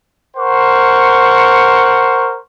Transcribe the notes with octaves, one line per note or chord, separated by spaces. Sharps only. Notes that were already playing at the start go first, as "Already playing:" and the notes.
A#4 C5 F#5 C#6